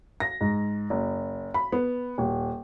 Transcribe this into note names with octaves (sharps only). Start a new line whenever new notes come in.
A#6
G#2
F#1
B5
B3
D#1